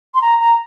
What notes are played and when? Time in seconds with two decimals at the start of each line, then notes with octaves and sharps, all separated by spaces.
0.15 C6
0.22 A#5
0.40 A#5